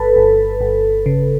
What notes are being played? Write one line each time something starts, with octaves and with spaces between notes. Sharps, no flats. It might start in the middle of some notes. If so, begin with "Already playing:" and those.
Already playing: G1 A4 B4
G1
G1
C#3